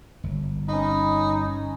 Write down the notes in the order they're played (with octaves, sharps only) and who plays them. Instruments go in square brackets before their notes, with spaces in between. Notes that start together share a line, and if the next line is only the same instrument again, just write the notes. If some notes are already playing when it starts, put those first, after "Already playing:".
[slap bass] G1
[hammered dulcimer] C#4 B5 [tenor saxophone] D#4